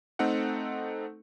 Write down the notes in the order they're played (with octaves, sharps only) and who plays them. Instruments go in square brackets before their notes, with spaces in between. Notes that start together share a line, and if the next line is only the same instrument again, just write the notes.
[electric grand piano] A3 C4 D#4 A4 F#5